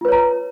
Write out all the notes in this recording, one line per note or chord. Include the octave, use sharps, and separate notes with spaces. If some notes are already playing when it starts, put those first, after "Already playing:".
F4 B4 C#5 A#5